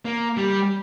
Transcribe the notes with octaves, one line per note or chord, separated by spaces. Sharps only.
A#3
G3